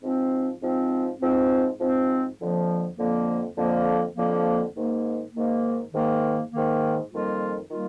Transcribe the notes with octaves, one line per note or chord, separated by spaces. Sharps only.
G#2 F3 C4
G#2 F3 C4
G#2 F3 C4
G#2 F3 C4
F2 D3 F3 A#3
F2 D3 F3 A#3
F2 D3 F3 A#3
F2 D3 F3 A#3
G#2 D#3 A#3
G#2 D#3 A#3
G#2 D#3 A#3
G#2 D#3 A#3
F2 D#3 G3 A#3 F4
D#3 G3 A#3 F4